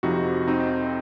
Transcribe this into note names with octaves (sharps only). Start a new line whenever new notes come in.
F2 C3 F3 D#4 F#4
C4 D#4